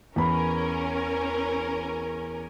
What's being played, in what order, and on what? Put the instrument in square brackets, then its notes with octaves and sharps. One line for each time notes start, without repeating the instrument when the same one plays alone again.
[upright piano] E2 B5 [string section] C#4 A#4 G#5